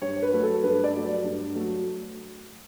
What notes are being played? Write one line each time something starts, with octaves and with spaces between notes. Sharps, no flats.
G2 C#5
B4
F#3 A3
A4
G2 B4
D5
F#3 A3
G2
F#3 A3